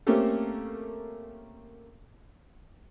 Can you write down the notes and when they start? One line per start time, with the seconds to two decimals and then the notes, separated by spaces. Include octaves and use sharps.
0.07 A3 A#3 C4 C#4 G4 A4